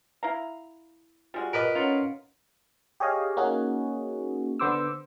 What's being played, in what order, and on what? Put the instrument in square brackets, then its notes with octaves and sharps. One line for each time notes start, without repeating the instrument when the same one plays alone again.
[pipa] E4 F5 A#5
[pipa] G3 G#3 F#4 [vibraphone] F4
[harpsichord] A#4 B4 D#5
[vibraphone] C#4 C#5 F#5 [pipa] D#4 F4
[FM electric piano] G4 G#4 C#5 D#5 F5
A#3 C#4 D#4 F#4 G#4
D3 B3 C5 D6 E6